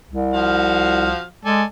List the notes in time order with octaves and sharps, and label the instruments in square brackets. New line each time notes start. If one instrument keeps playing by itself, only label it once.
[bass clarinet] C2
[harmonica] F3 F#4 F5
[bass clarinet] G#3 [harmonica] A4 D5 G#5